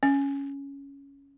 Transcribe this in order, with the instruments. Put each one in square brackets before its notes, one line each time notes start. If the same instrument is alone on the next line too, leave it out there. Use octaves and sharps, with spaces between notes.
[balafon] C#4